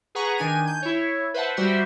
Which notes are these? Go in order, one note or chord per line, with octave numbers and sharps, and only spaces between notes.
G#4 B4 F#5 A#5 C#6
D#3 D4 G#5 D#7
G6
E4 C#5
B4 C5 E5 F#5 A5
G3 F#4 C5 E5